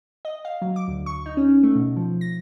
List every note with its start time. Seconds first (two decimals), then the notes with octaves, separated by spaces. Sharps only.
0.25 D#5
0.45 F5
0.62 F#3
0.76 D6
0.88 D2
1.06 C#6
1.26 D#4
1.37 C#4
1.63 A3
1.75 B2
1.96 F3
2.21 A#6